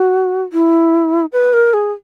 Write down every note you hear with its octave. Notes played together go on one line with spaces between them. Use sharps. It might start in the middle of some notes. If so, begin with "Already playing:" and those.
Already playing: F#4
E4
B4
A#4
G#4